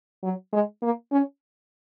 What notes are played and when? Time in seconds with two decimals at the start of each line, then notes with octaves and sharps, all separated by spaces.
0.23 F#3
0.53 G#3
0.82 A#3
1.12 C#4